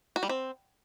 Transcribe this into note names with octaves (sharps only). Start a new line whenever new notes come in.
F#4
G3
C4